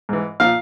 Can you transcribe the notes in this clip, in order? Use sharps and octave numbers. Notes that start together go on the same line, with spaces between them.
G#2 E3
A#2 F3 F5